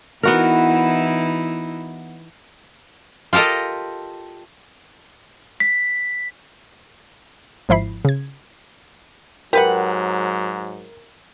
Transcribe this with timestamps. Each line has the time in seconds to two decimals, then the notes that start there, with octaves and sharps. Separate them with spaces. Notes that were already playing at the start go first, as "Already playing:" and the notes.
0.23 E3 B3 D#4 E4 F#4 A#4
3.33 F4 G4 A4 A#4 D#5
5.60 B6
7.69 G#1 F3 E4 B5 C7
8.05 C#3 G#6
9.53 G#2 F#3 G4 A#4 B4 F#5